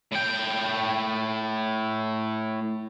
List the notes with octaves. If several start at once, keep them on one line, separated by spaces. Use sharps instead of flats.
A2 G5